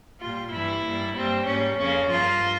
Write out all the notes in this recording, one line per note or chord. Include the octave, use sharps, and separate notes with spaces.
A#2 G3 A#3 F4
G2 E3 G3 A#3 E4
G2 G3 A#3
G2 G3 A#3 C4
G#2 G3 A#3 C#4
F2 C#3 F3 A#3 C#4
G2 F3 A#3 F4